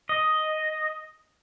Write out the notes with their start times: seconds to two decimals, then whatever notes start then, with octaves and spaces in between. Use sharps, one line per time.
0.09 D#5